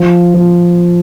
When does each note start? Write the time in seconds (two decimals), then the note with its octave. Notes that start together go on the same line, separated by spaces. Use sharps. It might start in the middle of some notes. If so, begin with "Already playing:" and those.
Already playing: F3
0.34 F3